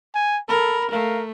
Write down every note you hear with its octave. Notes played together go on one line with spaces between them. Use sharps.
G#5
A4 A#4 B5
A3 A#4 F5